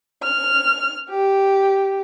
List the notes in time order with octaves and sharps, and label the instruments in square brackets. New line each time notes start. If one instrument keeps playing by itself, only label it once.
[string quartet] F6
G4